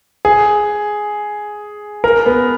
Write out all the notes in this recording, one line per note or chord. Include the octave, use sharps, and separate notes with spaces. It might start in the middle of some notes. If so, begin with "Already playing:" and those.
G#4
A#4
B3